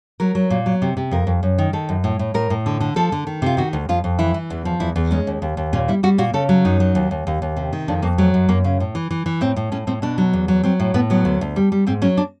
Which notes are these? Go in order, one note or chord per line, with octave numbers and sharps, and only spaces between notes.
F#3 A#4
F#3
A#2
F#3
C3
C3
F2 A#4
F2
F#2
D#3
D#3 A4
F#2
A2
A2
A2 A#4
A2
D3
D3
F3 A4
D3
D#3
C3 F4
D#3 F#4
D2
F2 F4
F2
E3 E4
E3
E2
F3
E2 E4
E2
G#3 C#4
D#2
D#2
D#2
A#2 C#4
G3 E4
G3 F#4
A#2 F#4
C#3 A4
F#3
F#2 D#4
F#3
D#2
D#2
D#2
D#2
C3
D#3
F2 D4
F2 A#3
F#3 A3
F#2
F#2 A#3
C#3
A2
E3
E3
E3
A2 C4
A2
A2 C#4
A2 C4
B2 D4
F#3
E2
F#3
F#3 C4
A2
A2 B3
F#3 B3
D2
D2
G3
G3
G#2 C4
F#3 C#4
D4